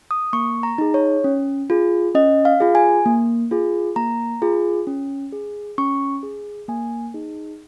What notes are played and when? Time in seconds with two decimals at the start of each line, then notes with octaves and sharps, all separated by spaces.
0.11 D#6
0.33 A#3 C#6
0.63 A#5
0.78 D#4 G#4
0.94 C#5
1.24 C#4
1.70 F4 G#4
2.15 C#4 D#5
2.45 F5
2.60 F4 G#4
2.75 G#5
3.06 A#3
3.51 F4 G#4
3.96 A#3 A#5
4.42 F4 G#4
4.87 C#4
5.33 G#4
5.78 C#4 C#6
6.23 G#4
6.68 A#3 G#5
7.14 D#4 G#4